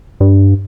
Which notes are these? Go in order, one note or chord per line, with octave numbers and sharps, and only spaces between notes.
G2